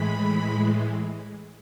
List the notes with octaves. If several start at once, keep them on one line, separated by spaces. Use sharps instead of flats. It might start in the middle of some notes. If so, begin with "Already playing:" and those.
Already playing: A2 E3 G#3 B5